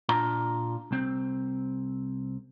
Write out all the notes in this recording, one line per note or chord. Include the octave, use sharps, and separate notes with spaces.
A#2 D4 F4 A#5
C2 C4